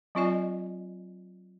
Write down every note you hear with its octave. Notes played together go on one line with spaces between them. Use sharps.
F#3 C4 F4 D5 D#5 G#5